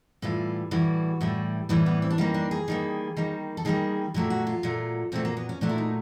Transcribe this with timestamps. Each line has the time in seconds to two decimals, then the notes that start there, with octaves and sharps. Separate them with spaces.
0.22 A2 E3 G3 F4
0.71 A2 E3 G3 F#4
1.21 A2 E3 G3
1.69 A2 E3 G3
1.86 B3
2.02 C4
2.10 D4
2.18 D#3 G3 A#3 C#4
2.34 D4
2.51 G#4
2.68 D#3 G3 A#3
3.17 D#3 G3 A#3
3.57 A4
3.65 D#3 G3 A#3 G#4
4.14 A#2 F#3 A3 G4
4.30 F#4
4.47 F4
4.63 A#2 F#3 A3
5.12 A#2 F#3 A3 C4
5.25 A#3
5.37 B3
5.49 C#4
5.61 A#2 F#3 A3 D4
5.69 E4
5.78 D#4